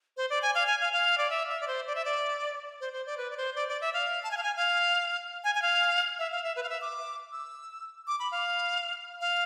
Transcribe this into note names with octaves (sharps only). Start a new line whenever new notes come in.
C5
D5
G#5
F5
G#5
F5
F5
D5
E5
E5
D5
C5
D5
E5
D5
C5
C5
D5
B4
D5
C5
D5
D5
E5
F5
A5
G#5
F5
G#5
F5
G#5
G#5
F5
E5
F5
E5
B4
F5
E5
D6
E6
D6
B5
F5
F5